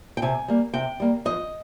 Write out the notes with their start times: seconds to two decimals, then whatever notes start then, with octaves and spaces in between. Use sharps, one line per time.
0.17 G5
0.22 C3 G#5
0.48 G3 A#3
0.74 C3 G5
1.00 G3 A#3
1.25 F2 D#5